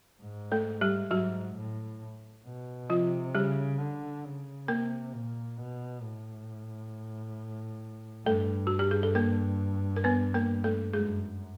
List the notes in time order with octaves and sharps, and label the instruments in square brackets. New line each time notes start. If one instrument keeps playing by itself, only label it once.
[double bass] G#2
[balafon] A3 A4
G3 G4
[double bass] G#2 [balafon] F#3 F#4
[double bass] A2
B2
[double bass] C3 [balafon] F3 F4
[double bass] C#3 [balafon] G3 G4
[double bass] D3
C#3
[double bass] C3 [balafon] A#3 A#4
[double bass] A#2
B2
A2
[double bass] G2 [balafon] A3 A4
[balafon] F#4
G4
G#4
A4
A#3 A#4
A#4
B3 B4
A#3 A#4
A3 A4
[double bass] F#2 [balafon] G#3 G#4